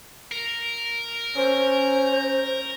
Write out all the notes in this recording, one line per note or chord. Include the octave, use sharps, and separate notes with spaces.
A#4
C#4 C5